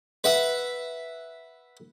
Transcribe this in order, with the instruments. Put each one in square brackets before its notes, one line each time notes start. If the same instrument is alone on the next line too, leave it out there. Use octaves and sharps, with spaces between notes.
[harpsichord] B4 E5 F#5